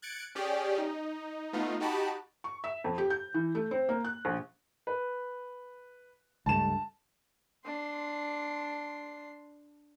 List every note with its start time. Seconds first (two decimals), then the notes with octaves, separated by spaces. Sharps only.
0.02 F#6 G#6 A6 C#7 D7
0.35 C#4 G4 G#4 D5
0.78 D#4
1.53 A3 B3 D#4 F4
1.80 D#4 F#4 G4 A5 B5 D6
2.44 C#6
2.64 E5
2.84 F2
2.98 G4
3.10 G6
3.34 E3
3.55 A3
3.71 C4
3.89 A#3
4.05 F#6
4.25 A#1
4.87 B4
6.46 C#2 G2 A3 A5 E7
7.65 D4 C6